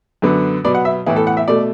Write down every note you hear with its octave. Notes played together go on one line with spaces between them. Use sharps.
F#2 D3 B3
B2 F#3 B3 D5
F#5
E5
A2 E3 B3 E4
A4
F#5
E5
B2 A3 D5